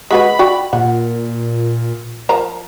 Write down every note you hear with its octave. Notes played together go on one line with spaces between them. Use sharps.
G#3 F#4 B4 B5
F#4 D5 G5
A#2 F#5
F3 A#4 A#5